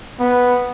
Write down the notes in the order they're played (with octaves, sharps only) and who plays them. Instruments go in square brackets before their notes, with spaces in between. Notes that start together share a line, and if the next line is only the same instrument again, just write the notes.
[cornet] B3